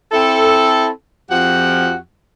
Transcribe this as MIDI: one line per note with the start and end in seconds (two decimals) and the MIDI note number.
0.12 0.87 60
0.12 0.87 64
0.12 0.87 69
1.30 1.96 41
1.30 1.96 53
1.30 1.96 66
1.30 1.96 67
1.30 1.96 78